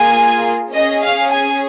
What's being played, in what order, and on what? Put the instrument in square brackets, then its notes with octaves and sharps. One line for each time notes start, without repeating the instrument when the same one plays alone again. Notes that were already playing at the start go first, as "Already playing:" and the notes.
Already playing: [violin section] A#3 F4 G#4 G#5
C#4 G#4 D#5
F5
G#5